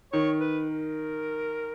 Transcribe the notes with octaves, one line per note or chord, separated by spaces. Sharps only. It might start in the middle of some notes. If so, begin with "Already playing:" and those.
D#3 C#5
B4
A#4